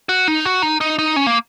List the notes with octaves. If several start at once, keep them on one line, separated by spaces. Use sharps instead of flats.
F#4
D#4
F#4
D#4
D#4
D#4
C#4
A#3